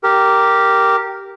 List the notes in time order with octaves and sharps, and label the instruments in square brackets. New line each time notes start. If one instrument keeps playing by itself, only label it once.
[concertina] G4 A#4